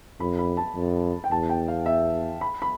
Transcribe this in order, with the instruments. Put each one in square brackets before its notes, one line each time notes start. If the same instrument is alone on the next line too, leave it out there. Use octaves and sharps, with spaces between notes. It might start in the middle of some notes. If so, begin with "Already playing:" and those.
[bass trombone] F2 [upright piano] B5
[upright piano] B5
A5
[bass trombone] F2
[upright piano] G5
[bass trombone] E2 [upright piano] A5
[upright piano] G5
F5
E5
B5
B5